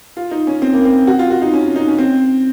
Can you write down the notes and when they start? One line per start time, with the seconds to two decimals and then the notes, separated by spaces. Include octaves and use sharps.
0.17 F4
0.31 D#4
0.47 C#4
0.62 C4
0.74 A#3
0.85 C4
1.07 F#4
1.19 F4
1.30 F#4
1.42 D#4
1.54 C#4
1.76 D#4
1.88 C#4
1.98 C4